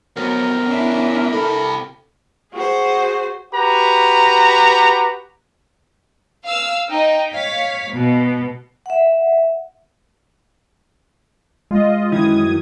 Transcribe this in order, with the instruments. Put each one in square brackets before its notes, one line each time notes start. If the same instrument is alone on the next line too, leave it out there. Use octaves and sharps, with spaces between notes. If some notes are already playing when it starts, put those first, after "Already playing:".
[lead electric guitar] D2 B3 [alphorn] F#3 [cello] C4 [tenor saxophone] A#4
[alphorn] C#4 [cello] D4 E4
[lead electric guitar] C3 B5 [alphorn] A4
[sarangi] F#4 [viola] G#4 C5
[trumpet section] F#4 G4 B4 A#5
[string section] F5 E6
D#4 G5
C#5 F5 B6
B2
[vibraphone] E5 F#5
[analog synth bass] G#3 [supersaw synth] F4 D#5
[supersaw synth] F#2 D#6 G#6 [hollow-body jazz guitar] D#3 E3 [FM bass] E4